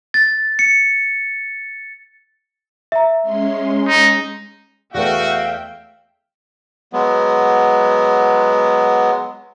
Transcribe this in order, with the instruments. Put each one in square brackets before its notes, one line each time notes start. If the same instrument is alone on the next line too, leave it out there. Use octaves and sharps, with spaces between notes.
[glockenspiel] A6
C#7
[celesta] E5 A#5
[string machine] G#3 C#4 C6
[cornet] D#4
[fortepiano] E2 A3 B3 [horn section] F#4 [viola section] E5 G5 [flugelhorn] F5
[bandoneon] F#3 G#3 B3